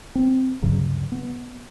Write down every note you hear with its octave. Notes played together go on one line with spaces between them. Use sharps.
C4
D2 G2 C#3 F#3
B3